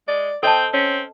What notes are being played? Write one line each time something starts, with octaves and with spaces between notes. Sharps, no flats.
G#3 D5
C4 A4 D#5 G5 A5
C4 C#4